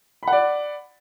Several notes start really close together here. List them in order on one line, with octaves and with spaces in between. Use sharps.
B5 F#5 D5